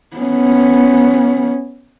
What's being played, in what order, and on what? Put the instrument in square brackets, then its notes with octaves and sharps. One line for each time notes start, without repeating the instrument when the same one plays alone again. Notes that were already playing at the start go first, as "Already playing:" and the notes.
[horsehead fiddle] B3 C#4